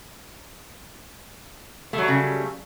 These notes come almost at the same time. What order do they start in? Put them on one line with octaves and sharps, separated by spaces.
A3 F#3 G3 C#3